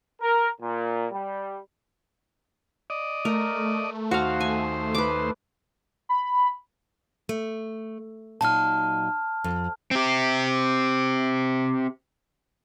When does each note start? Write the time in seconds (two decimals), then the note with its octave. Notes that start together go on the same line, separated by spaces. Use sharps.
0.21 A#4
0.60 A#2
1.11 G3
2.90 D5 D#5
3.25 A3 A#4
4.11 D#2 F#4 C5 F5
4.40 G#5
4.95 B4 D6
6.09 B5
7.29 A3
8.41 A#2 F#3 D#4 A5 F6
9.44 F2
9.91 C4 G4